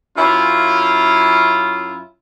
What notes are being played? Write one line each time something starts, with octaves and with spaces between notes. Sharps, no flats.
F#2 C#4 E4 F4